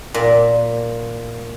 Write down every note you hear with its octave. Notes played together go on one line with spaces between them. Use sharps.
A#2